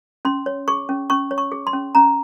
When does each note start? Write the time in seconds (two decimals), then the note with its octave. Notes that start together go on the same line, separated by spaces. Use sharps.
0.25 C#4 C6
0.46 C#5
0.68 G#4 C#6
0.89 C#4
1.10 C#4 C#6
1.31 C#5
1.38 C#6
1.52 G#4
1.67 C6
1.73 C#4
1.95 C#4 A#5